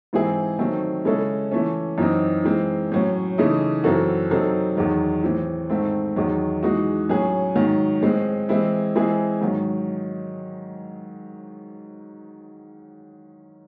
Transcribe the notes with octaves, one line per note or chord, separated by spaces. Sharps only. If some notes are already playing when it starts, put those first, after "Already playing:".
G#2 E3 C4 E4 G#4
C3 D#3 F#3 A3 C4
C#3 G#3 C#4 E4 A4
E3 A3 C#4
F#2 E3 C4 D#4
E3 G#3 C4
A2 F#3 C#4
C#3 E3 A3 D#4
F#2 E3 C4 F#4 A4
C3 F#3 C4 D#4 A4
E2 D#3 F#3
A2 E3 C4
G#2 D#3 A3 C4
E2 D#3 F#3
E3 G#3 D#4 F#4
A2 F#3 C#4 G#4
G#2 D#3 F#3
A2 G#3 C4
E3 G#3 C4 E4
E3 G#3 C4 E4 G#4
G#2 D#3 F#3